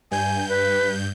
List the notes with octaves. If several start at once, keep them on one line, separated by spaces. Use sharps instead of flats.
G2 G#5 G6
B4